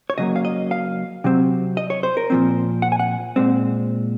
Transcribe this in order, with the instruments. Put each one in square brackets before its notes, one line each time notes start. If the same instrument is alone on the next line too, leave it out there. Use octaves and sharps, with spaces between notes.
[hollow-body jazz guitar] C#5
C#3 F#3 A#3 D#5
F5
D#5
F5
C3 F#3 C4
D#5
C#5
C5
A#4
A#2 F3 C4
F#5
G#5
F#5
A#2 G#3 C4